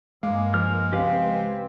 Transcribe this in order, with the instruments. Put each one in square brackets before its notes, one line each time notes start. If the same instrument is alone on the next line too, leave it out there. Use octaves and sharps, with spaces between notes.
[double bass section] G2 A#3 [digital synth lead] G#3 [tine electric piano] F5 D6
[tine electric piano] F3 [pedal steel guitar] A#4 F6
[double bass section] C#2 C4 [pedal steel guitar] G4 B4 F5